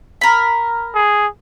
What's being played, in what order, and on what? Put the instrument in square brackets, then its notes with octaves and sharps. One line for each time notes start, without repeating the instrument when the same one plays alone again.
[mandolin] A#4 B5
[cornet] G#4